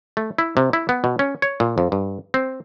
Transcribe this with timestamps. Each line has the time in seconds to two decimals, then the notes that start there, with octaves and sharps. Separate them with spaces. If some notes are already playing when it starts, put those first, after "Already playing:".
0.17 A3
0.38 E4
0.57 C3
0.73 E4
0.89 B3
1.04 B2
1.19 C#4
1.42 C#5
1.60 A#2
1.78 F2
1.92 G2
2.34 C4